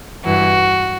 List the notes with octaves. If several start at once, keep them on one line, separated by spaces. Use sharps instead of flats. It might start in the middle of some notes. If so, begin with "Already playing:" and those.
G2 E3 F#4